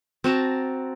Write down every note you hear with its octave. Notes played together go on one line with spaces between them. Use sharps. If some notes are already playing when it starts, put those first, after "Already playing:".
C4 F#4 A5 A#5